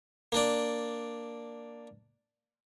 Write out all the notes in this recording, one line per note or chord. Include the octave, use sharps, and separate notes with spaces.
A#3 D4 D5